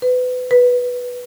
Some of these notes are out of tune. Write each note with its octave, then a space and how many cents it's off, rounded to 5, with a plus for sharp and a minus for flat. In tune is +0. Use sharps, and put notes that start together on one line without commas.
B4 +25
B4 -5